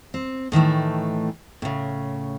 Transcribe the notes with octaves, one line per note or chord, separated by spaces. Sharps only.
C4
A2 D#3 E3 A3
A2 C#3